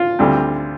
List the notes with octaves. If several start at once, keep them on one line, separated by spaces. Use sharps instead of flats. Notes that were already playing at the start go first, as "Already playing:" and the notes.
Already playing: F4
D2 D3 G3 C4